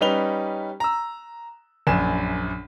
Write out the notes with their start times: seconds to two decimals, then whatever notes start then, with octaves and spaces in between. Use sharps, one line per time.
0.01 G3 C#4 D#4 B4 F7 G7
0.80 A#5 E6
1.87 A#1 F#2 G#5 E7